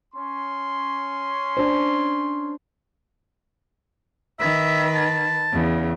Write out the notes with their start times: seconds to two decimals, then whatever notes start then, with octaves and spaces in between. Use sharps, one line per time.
0.15 C#4 C6
1.57 D4 C5
4.39 D#3 B4 E5
4.95 A5
5.54 E2 C#3